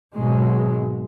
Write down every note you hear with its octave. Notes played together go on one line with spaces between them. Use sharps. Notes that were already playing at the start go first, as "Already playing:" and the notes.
G#1 B2 F#3 G#3